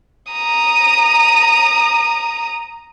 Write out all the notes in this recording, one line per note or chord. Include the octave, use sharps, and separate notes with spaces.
A#5 D#6